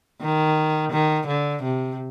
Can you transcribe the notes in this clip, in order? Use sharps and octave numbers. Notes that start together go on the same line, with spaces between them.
D#3
D#3
D3
C3